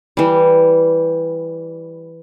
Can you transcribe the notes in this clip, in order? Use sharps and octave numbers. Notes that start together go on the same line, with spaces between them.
E3 G3